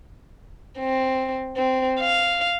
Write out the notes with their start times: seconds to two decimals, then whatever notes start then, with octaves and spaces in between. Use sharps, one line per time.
0.79 C4
1.57 C4
2.00 F5